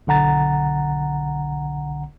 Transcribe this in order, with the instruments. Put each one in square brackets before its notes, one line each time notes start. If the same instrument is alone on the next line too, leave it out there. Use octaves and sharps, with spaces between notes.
[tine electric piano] B1 D3 F#5 A#5 A6